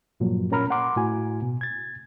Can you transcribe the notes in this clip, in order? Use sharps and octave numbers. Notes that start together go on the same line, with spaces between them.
G2 A#2 F3 F#3 A#3
A#2 C#4 A#4 A#5 B5 F6
F#5 A#5 C6 D6
A2 E4 F#4 G#5
B2
G#6 A6